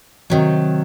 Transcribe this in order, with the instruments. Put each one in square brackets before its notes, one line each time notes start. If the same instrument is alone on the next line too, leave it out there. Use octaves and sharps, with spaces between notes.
[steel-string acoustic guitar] C3 D#3 F#3